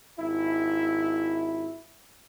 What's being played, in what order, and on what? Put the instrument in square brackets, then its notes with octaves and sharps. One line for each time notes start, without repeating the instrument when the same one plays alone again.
[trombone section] G#1 E4